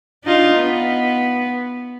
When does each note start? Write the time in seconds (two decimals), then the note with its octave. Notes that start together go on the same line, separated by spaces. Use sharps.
0.24 D4 D#4 F4
0.55 B3